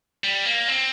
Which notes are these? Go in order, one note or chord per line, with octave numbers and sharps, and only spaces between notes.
G3
A#3
C4